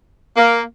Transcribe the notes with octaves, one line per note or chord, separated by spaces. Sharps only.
A#3